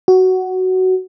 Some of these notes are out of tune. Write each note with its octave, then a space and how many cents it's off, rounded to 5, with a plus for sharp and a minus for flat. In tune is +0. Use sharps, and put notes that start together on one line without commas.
F#4 +10